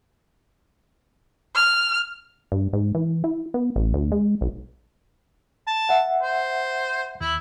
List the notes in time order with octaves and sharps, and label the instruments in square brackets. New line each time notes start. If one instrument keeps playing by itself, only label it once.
[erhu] F6
[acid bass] G2
G#2
E3
E4
B3
A1
D2
G#3
B1
[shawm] A5
[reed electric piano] E5 F#5
[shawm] C5
[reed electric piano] D#2 [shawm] E4